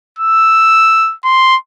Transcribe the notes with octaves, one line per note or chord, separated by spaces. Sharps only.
E6
C6